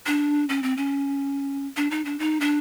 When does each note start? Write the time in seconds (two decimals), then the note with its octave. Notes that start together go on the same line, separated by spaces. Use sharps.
0.06 D4
0.49 C#4
0.63 C4
0.77 C#4
1.77 D4
1.91 D#4
2.05 D4
2.19 D#4
2.41 D4